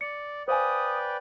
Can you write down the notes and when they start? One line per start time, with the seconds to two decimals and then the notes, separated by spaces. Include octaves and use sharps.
0.01 D5 C#7
0.48 B4 C5 D5 F5 G5 G#5 D#6